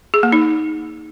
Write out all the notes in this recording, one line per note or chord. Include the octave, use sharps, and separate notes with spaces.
G#4
A#3
D#4